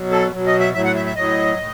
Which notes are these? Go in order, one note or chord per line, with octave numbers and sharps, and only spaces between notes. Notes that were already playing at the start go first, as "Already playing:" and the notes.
Already playing: B2 F#3
A4
B2 F#3
D#5
E5
A2 F#3 E5
F#5
E5
E5
A2 F#3 D#5
A2